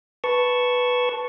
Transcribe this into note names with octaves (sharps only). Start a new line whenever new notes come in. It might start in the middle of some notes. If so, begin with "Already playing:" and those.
B4 A5 C#6